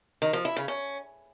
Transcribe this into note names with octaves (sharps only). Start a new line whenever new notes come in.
D#3
F3
E4
C#3
C#4